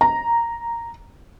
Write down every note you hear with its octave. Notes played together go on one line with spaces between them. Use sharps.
A#5